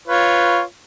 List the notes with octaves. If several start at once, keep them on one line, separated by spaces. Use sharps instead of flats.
F4 B4 C#5